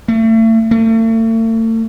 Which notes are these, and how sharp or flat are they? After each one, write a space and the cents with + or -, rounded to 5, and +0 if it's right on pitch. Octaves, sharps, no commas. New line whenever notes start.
A3 +35
A3 +40